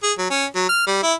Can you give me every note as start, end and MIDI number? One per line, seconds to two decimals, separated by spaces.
0.03 0.12 68
0.18 0.28 54
0.31 0.46 61
0.55 0.64 54
0.69 0.85 89
0.87 0.99 55
1.03 1.13 64